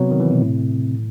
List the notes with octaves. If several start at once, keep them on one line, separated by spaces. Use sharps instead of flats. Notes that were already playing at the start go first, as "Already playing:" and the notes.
Already playing: C3 F#3 B3
D#3
E3
B2
A2